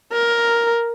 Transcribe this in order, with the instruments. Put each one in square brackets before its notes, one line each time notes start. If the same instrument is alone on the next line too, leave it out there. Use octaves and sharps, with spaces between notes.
[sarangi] A#4